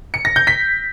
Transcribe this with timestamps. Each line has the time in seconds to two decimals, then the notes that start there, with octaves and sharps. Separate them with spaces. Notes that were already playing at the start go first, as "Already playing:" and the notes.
0.14 C#7
0.25 A#6
0.36 G6
0.47 B6